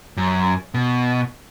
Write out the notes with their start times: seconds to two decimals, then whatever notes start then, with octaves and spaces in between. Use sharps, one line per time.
0.17 F#2
0.74 B2